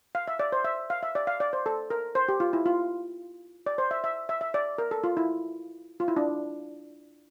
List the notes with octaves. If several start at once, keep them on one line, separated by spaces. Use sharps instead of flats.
F5
E5
D5
C5
E5
F5
E5
D5
F5
D5
C5
A4
A#4
C5
G4
F4
E4
F4
D5
C5
E5
E5
E5
E5
D5
A#4
A4
F4
E4
F4
E4
D4